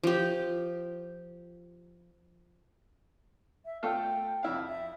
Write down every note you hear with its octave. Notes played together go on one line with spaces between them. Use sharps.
F3 G4
E5
A3 F4 A4 G5
F2 E4 F5
E5